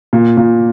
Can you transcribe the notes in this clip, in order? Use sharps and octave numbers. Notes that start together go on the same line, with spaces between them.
A#2
A#2